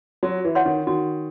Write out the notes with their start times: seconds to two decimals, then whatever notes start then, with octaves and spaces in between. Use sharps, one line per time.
0.23 F#3 F#4
0.45 E3
0.55 C#5 F#5 C6
0.66 D#3
0.87 D#3 F#4